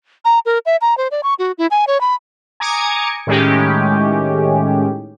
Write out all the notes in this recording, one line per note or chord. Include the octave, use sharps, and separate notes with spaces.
A#5
A#4
E5
A#5
C5
D5
C#6
F#4
E4
G#5
C#5
B5
G#5 A#5 D6 D#6 G#6 C#7
A2 D#3 G#3 C#4 G4